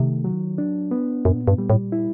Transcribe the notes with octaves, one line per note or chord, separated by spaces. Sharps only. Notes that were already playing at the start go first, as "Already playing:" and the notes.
Already playing: C3 D#3 A3
F#3
D4
B3
F#2 A#2
G2
G3
A2
E4